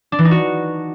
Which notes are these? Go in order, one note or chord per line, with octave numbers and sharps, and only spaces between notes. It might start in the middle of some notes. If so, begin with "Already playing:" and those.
D4
E3
D#4
F#4